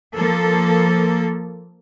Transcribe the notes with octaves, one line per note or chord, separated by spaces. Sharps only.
F3 A#3 A4